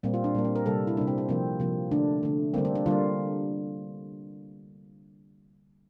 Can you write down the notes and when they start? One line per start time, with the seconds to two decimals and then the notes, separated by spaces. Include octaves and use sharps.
0.03 A#2 G3 A#3 C4
0.14 F4
0.24 D4
0.35 A#2 G3 A#3
0.45 C4
0.56 A#4
0.66 C3 G3 A#3 A4
0.87 E4
0.97 C3 G3 A#3 D4
1.07 C4
1.18 C4
1.29 C3 F3 A#3 C4
1.60 C3 F3 A#3
1.91 D3 A3 D4
2.23 D3 A3
2.54 D3 G3 A#3 C4
2.65 D4
2.75 D4
2.86 D3 G3 A#3 F4